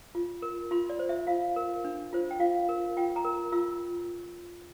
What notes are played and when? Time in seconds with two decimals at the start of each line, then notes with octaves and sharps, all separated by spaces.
0.15 F4
0.42 A#4
0.71 F4 C6
0.90 D5
0.99 C5
1.09 E5
1.27 F4 F5
1.56 A#4
1.84 D4
2.13 F4 C5
2.31 G5
2.40 F4 F5
2.69 A#4
2.97 F4 G5
3.16 A#5
3.25 A#4
3.52 F4 E6